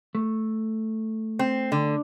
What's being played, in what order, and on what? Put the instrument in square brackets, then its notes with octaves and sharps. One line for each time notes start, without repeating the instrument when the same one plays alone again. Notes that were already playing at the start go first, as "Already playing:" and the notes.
[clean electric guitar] A3
[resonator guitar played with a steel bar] C4
D3